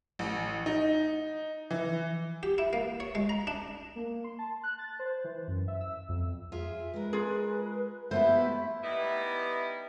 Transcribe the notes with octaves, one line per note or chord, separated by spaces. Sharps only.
A1
D#4
E3
G4
E4
A#3
C#5
G#3
A#5
D4
A#3
C6
A5
F#6
A6
C5
E3
F#2
E5
E6
F2
F4 G#4 E5
G#3 A#4 B4
F4 G#4
A3 B3 E4 G4 C5 E5
G3 B3 D#4 E4 B4 E5